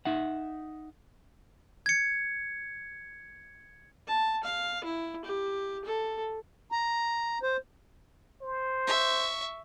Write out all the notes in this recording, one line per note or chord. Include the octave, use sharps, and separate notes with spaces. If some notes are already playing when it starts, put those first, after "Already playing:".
D#4 E5 F#5
G#6 C#7
A5
F5
E4
G4
A4
A#5
C5
C5
E5 C#6